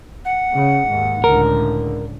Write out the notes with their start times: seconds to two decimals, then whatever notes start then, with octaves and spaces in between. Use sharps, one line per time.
0.25 F#5
0.54 C#3
0.87 D#2 G#2
1.24 C#2 A2 D3 A#4